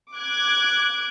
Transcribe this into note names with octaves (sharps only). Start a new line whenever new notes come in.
D6 F#6 G#6